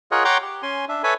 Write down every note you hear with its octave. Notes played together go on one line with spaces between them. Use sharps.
F4 G#4 A#4 C#5 D#5 F#5
C#5 F#5 G5 A#5 C6 D6
G4
C#4 G#5 C6
D4 E5
A4 B4 C#5 E5 G#5 B5